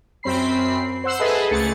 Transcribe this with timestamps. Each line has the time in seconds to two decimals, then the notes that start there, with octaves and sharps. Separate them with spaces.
0.23 F#2 C4 B5 C7
1.04 C5 F#5 E6 C7
1.19 G#4 A4 B4 D#5 E5
1.51 C#2 A3 G#4 A6 C#7